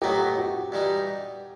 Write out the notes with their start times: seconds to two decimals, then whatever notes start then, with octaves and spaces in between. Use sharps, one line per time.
0.02 A2 F#3 B3 D#4 G4
0.37 F#4
0.72 G2 E3 G3 D#4